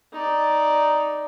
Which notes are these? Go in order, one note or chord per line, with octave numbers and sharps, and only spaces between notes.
D#4 D5